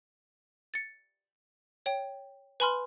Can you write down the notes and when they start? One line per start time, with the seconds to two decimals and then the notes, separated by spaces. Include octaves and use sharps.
0.74 A6 C#7
1.86 C#5 G5
2.60 B4 G#5 B5 C6 F6